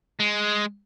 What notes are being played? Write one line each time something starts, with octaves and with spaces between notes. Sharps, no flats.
G#3